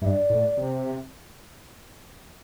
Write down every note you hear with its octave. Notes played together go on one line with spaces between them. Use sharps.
G2 E5
D5
A2
C3